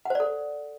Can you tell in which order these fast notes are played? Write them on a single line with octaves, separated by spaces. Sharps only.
F#5 C5 D5 A4